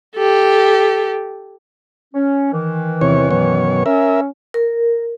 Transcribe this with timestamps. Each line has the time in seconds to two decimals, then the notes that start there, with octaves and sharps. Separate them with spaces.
0.17 G4 A4
2.14 C#4
2.52 D#3 E3
3.01 E2 C3 C#5
3.31 F#2 B2 C#5
3.86 C#4 A#4 E5
4.54 A#4